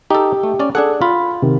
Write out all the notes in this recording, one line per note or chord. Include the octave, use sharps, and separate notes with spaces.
D#4 G4 A4
A3
C#4 D5
D4 G#4 A4 F#5
F4 B5
C3 D#3